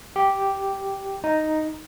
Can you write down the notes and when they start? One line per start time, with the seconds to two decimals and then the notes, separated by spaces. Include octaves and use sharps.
0.16 G4
1.24 D#4